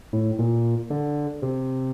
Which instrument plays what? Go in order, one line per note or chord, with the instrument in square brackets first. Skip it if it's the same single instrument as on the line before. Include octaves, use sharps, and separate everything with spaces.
[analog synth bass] A2
A#2
D3
C3